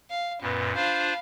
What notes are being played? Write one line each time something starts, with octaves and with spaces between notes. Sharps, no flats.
F5
F#2 A#2 B3
D4 F4 C5 F5 B5